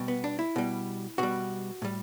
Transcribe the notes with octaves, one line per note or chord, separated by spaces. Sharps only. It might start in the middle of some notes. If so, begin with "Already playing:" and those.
Already playing: B2 G3
B3
D4
E4
B2 G3
B2 G3 F#4
A2 G3